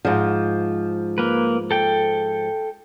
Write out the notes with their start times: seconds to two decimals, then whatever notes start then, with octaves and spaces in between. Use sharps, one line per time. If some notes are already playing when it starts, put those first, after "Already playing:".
0.05 G#2 F3
1.18 A#3 B4
1.71 A4 G5